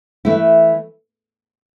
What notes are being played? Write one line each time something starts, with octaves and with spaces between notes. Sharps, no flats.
E3 A3 E4